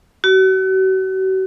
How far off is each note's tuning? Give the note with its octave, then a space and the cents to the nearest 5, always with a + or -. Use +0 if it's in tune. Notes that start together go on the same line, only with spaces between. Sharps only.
F#4 +40